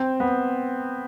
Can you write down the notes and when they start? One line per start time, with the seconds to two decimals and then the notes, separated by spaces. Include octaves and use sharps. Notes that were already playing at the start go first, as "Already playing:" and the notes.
Already playing: C4
0.20 B3